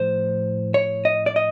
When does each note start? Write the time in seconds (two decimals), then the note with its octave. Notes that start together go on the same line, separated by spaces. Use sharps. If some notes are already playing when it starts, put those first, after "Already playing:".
Already playing: A2 F3 C5
0.74 C#5
1.05 D#5
1.26 D5
1.36 D#5